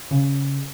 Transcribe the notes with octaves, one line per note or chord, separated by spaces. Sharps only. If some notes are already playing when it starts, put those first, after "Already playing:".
C#3